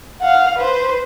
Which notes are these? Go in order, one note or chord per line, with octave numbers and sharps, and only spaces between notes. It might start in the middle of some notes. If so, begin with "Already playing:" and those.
F5 F#5
B4 C5